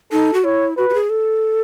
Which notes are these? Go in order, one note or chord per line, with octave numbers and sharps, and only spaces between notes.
D#4 A4
F#4
E4 C#5
F#4 B4
F#4
G#4
A4